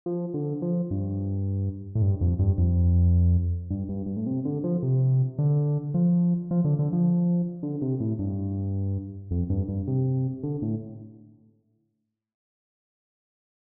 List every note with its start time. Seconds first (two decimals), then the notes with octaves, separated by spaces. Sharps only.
0.06 F3
0.34 D3
0.62 F3
0.91 G2
1.95 A2
2.02 G2
2.21 F2
2.39 G2
2.58 F2
3.70 G2
3.89 G2
4.06 G2
4.17 A2
4.27 C3
4.45 D3
4.64 F3
4.83 C3
5.39 D3
5.94 F3
6.51 F3
6.65 D3
6.79 D3
6.93 F3
7.63 D3
7.82 C3
8.00 A2
8.19 G2
9.31 F2
9.50 G2
9.69 G2
9.88 C3
10.43 D3
10.62 A2